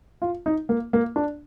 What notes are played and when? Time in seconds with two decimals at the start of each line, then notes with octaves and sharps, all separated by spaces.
0.22 F4
0.46 D#4
0.69 A#3
0.93 A#3
1.16 D4